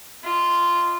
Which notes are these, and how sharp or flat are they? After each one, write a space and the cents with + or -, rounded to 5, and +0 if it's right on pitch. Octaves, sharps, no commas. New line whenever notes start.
F4 -10 D#5 +0